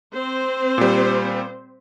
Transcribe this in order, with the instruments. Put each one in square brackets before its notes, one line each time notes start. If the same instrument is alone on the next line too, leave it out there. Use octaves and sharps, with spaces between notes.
[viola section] C4 C5
[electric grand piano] A#2 G3